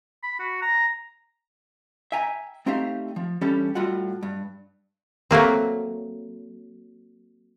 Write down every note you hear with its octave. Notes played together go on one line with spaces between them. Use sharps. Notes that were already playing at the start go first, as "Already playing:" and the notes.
B5
F#4
A#5
E5 G5 G#5 A#5
A3 C4 D#4 G4 E5 F5
F3
E3 G3 C#4 D4 G4 A4
A2 G3 F4 F#4 F#5
G2
F#3 A3 A#3 C4